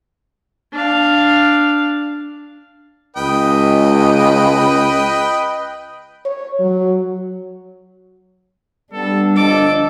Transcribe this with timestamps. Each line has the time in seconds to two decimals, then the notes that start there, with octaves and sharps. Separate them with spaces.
0.73 D4 F5
3.17 C#2 B4 D#5 G5
6.25 C#5
6.59 F#3
8.93 G3 B3 D4 A4
9.36 G1 F3 A4 D#5 D6